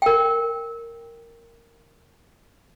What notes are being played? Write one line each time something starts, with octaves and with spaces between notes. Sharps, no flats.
A#4 G5